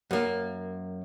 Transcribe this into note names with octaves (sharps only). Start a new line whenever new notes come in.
F#2 A#3